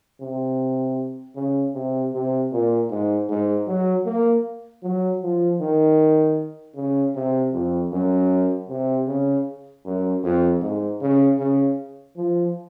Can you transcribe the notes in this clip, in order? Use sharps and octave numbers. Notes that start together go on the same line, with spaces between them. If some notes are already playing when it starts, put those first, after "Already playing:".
C3
C#3
C3
C3
A#2
G#2
G#2
F#3
A#3
F#3
F3
D#3
C#3
C3
F2
F#2
C3
C#3
F#2
F2
G#2
C#3
C#3
F3